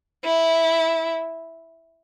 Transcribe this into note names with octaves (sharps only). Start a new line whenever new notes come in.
E4